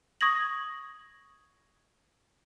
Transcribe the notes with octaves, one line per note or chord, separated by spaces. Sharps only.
C#6 D#6 G#6 A#6 F#7